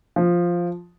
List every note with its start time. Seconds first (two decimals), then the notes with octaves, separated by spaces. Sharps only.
0.16 F3